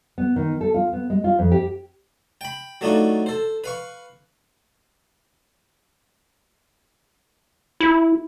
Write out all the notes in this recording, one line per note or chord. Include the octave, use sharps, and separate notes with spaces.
B3
D#3
A4
F4
B3
G#3
F4
F2
G4
G5 B5
F#3 A3 D4 D#4 F4 F#4
A4 C5
B4 F5 C#6
E4